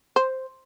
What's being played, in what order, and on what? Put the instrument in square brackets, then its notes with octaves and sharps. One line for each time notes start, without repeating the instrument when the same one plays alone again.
[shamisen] C5